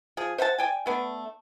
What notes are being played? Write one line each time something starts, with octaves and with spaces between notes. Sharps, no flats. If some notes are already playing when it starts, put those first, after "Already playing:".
F3 G#4
C5 E5 F#5 A5
D5 G5 G#5
A3 B3 D4